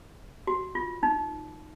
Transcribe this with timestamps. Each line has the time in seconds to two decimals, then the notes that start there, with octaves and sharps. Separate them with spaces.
0.47 F#4
0.75 F4
1.03 D#4